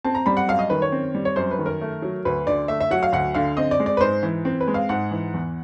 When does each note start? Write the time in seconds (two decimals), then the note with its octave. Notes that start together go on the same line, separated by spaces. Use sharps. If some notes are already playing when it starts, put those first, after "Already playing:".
0.05 C4 A5
0.15 A#5
0.26 G3 B5
0.37 F#5
0.48 F#2 F5
0.59 D#5
0.70 D#3 B4
0.82 C#5
0.92 C4
1.15 G3
1.25 C#5
1.36 F#2 C5
1.51 B4
1.59 D#3
1.66 A#4
1.81 A3
2.02 F#3
2.25 D2 B4
2.47 D3 D5
2.68 A3 E5
2.80 E5
2.91 F#3 F#5
3.03 F5
3.12 D2 F#5
3.34 D3 F5
3.57 C4 D#5
3.71 D5
3.80 G#3
3.86 D5
3.97 B4
4.01 G#2 C5
4.23 E3
4.45 C4
4.61 B4
4.68 G#3
4.74 F5
4.89 G#2 F#5
5.11 E3
5.34 E2